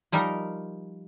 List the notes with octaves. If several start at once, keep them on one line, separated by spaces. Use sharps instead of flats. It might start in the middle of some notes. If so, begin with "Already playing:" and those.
F3 G3 D#4 A#4